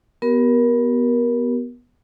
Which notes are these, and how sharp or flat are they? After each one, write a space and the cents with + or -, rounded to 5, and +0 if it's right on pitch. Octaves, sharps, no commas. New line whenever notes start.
B3 -5 G4 -35 A#4 +20